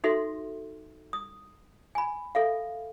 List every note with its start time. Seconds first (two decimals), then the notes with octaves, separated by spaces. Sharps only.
0.04 D#4 F#4 A4 E5 C6
1.13 D#6
1.95 G#5 B5
2.35 A4 E5 F5